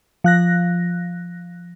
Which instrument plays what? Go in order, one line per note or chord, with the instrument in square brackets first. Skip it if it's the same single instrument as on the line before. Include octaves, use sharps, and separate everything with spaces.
[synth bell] F3 F#6 A#6